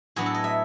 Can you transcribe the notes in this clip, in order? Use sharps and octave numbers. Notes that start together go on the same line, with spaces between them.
A2 F#3 B3 D4 G#4
A4
D#5
E5